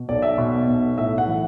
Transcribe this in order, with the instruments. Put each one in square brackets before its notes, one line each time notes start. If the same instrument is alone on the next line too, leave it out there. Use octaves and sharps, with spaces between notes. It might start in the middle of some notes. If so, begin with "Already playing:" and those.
Already playing: [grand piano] B2
B1 D5
E5
B2
B1
A2 E5
F#5
E3